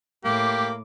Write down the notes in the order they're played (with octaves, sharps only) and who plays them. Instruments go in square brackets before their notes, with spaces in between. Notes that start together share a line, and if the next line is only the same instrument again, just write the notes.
[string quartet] A2 D6 [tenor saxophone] A#3 [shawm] G4